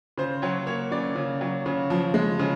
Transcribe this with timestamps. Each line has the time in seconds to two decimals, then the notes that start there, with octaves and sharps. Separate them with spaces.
0.18 C#3 C5
0.42 F#3 C#5
0.67 A#3 C#5
0.92 C#3 D5
1.16 C#3
1.41 F#3
1.66 C#3
1.90 F3
2.14 G#3
2.39 C#3